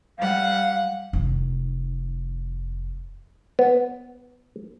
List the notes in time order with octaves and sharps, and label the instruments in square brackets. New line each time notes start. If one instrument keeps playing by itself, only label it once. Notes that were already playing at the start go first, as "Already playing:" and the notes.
[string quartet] G3 F#5 [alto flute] F5
[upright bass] F1 D#3
[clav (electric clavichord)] B3